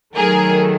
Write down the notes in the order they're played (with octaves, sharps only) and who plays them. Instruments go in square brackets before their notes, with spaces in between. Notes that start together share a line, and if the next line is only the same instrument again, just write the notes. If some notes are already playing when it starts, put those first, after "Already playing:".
[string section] D#3 F#3 A3 G#4 A#4